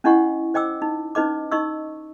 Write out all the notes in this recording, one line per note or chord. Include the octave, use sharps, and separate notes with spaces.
C#4 D4 E4 D#5 F#5 C#6
C5 D#5 G5 D6 E6
D#4
C#4 D#4 B4 D#5 D6
D#4 D#5 C#6 E6